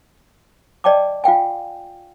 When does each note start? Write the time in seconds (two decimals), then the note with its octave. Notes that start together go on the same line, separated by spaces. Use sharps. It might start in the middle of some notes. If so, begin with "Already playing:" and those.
0.84 D5 D#5 G5 A5 D6
1.24 F4 F5 G5 G#5